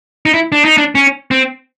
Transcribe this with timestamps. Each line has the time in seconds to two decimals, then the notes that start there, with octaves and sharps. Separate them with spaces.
0.26 D#4
0.34 E4
0.52 D4
0.65 D#4
0.78 D4
0.95 C#4
1.31 C4